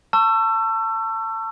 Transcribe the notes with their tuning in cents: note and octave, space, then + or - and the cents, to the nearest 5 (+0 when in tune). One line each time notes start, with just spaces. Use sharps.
A5 +25 C#6 +0 E6 +30